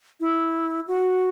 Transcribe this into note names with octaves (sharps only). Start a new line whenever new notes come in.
E4
F#4